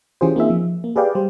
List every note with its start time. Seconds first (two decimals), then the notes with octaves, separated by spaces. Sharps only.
0.21 E3 C#4 F4 G4 G#4 C5
0.36 A#3 C4 D#4 F4 G#4 E5
0.50 F3
0.84 A#3
0.96 G4 G#4 B4 D5 F5 G5
1.15 G3 G4 C5